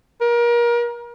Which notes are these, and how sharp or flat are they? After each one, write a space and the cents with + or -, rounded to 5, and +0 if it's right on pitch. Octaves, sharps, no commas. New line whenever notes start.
A#4 +30